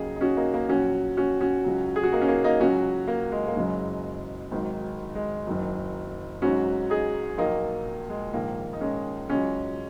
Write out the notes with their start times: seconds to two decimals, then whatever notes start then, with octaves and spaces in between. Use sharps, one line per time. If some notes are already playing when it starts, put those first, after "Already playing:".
Already playing: D#2 C#3 F#3 D#4 G#4
0.16 D#4
0.21 C#4 F#4
0.37 A#3 D#4
0.54 A#3
0.69 A#1 A#2 F#3 C#4 F#4
1.17 C#4 F#4
1.41 C#4 F#4
1.64 C#2 C#3 F#3
1.96 G#4
2.04 F#4
2.12 A#3 D#4
2.22 C#4
2.28 A#3
2.44 A#3 D#4
2.60 C#2 C#3 F#3 C#4 F#4
3.08 A#3
3.32 G#3
3.47 A#3
3.56 F#1 F#2 C#3 F#3 G#3
4.51 G#1 G#2 D#3 F#3
5.15 G#3
5.47 F#1 F#2 D#3 F#3
6.42 G#1 G#2 F#3 C#4 F#4
6.90 D#4 G#4
7.38 A#1 A#2 F#3 A#3 D#4
8.10 G#3
8.33 A#1 G#2 D#3 A#3
8.73 D#4
8.81 G#3 C#4
9.29 C#2 C#3 F#3 G#3 C#4